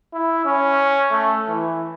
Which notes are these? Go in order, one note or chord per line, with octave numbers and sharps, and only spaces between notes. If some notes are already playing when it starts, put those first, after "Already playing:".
E4
C#4
A3
E3